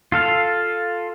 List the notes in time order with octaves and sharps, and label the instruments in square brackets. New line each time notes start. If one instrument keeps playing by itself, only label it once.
[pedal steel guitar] F4 A4 F5